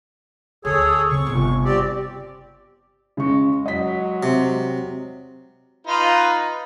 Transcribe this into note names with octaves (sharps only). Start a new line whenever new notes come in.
D2 G#4 A4 C#5
C#3 C4 C#6
G1 C3
C4 G4 D5
C#3 G#3 C#6
F#3 D#5 B6
C3
D#4 F4 B4